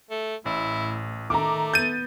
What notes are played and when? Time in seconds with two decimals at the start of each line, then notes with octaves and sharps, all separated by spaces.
0.11 A3
0.46 A1 A2 E4
1.30 D#3 A3 A#5 D6
1.74 B3 G6 A6 D#7